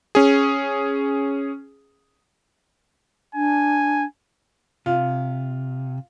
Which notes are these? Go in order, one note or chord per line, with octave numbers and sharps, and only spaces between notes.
C#4 G#4
D4 G#5
C3 F4